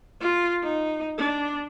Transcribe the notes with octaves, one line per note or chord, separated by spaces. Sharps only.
F4
D#4
D4